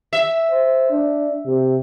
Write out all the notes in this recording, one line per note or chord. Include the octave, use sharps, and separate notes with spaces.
E5
C5
D4
C3